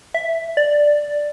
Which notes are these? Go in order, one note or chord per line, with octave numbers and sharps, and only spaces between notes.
E5
D5